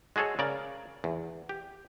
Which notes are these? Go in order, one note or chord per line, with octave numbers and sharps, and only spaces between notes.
G#3 F#4 G#4 A4 C#5
C#3 A#4 D5
E2
G4